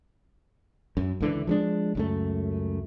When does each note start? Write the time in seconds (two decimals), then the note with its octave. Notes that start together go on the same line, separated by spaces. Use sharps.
0.97 F#2
1.20 C#2 D3 E3
1.47 F3 G#3 D4
1.95 C#2 F#2 A3